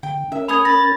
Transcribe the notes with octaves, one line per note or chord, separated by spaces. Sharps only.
D3 G5
C#4 A#4 E5
A4 G#5 B5 D#6 G#6 F7
B5 A6 A#6